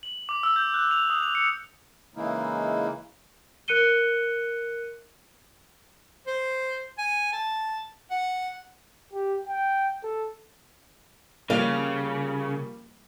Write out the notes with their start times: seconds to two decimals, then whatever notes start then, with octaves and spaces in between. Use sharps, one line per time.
0.03 F#7
0.29 D6
0.43 E6
0.56 G6
0.74 F#6
0.91 F7
1.10 D#6
1.23 F7
1.35 C#7
2.16 C#3 E3 G#3 A#3 D#4 E4
3.68 A#4 F#6 C#7 D#7 G7
6.27 C5
6.98 G#5
7.33 A5
8.11 F#5
9.13 G4
9.47 G5
10.03 A4
11.50 C#3 F3 G3 A#3 F5